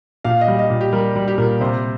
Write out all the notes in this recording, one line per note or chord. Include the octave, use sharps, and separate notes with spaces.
A#2 F5
D#5
G3
D#5
A#2
G4
G3 A#4
G3
G4
A#2 A#4
C3 C5